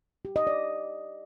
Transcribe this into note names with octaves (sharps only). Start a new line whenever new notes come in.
G4
D#5
D5